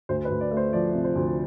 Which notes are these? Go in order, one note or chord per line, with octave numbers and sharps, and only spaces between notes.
D2 C5
B4
D2
D5
A3
C5
F3 D5
C3
C5
D2